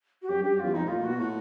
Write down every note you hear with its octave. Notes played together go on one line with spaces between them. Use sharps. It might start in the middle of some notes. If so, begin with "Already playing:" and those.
F#4
F#2 G4
G2 G4
F#2
E2 F4
F2 D#4
A2 F4
A#2
B2 F#4
A2 F#4